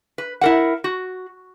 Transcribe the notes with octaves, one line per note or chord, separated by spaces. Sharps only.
B4
E4 A#4 F#5
F#4